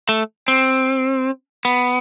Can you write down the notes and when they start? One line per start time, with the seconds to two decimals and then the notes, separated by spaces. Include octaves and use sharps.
0.09 A3
0.48 C4
1.65 B3